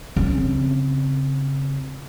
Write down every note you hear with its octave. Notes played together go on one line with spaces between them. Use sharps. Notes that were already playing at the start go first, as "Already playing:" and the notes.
C#3 C4